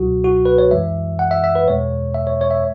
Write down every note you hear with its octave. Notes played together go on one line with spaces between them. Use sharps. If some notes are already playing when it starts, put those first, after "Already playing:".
Already playing: C#2 B2 F#3 F#4
F#4
B4
C#5
F#2 E3 G#3 E5
F#5
E5
E5
B4
E2 B2 G#3 C#5
E5
C#5
C#5
E5